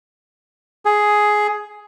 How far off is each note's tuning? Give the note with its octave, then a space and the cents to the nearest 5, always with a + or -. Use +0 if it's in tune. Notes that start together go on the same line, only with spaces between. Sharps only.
G#4 +10